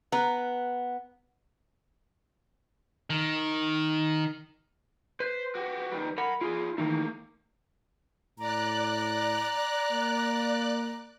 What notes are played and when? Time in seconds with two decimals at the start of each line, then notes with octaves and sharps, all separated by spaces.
0.12 B3 B4 A#5
3.10 D#3
5.20 B4 C5
5.55 F#4 G4
5.92 D#3 G3
6.18 A#4 F#5 B5
6.41 E4 F4 G#4
6.78 D#3 E3 A3 A#3 D#4
8.39 A2 D5 A#5 F#6
9.92 A#3